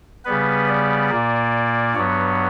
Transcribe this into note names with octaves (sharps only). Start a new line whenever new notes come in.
C#3 G3 B3 B4
D5
A#2 A#3
G2 F#3 B3 C#5